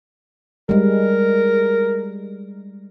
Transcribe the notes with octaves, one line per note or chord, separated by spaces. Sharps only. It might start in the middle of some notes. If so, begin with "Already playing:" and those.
G3 G#3 A#4